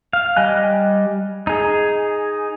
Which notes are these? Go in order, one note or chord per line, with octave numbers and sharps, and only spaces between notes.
F5
G3 D#5 G#5 F#6
D#4 G#4